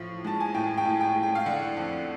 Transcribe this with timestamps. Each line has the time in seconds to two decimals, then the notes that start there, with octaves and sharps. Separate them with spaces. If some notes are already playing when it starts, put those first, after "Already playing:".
Already playing: A2 F3
0.24 G#3 A5
0.40 G#5
0.54 A2 G5
0.78 G5
0.85 A2
1.01 G5
1.16 A2
1.23 G5
1.35 F5
1.46 D3 F#5
1.77 F2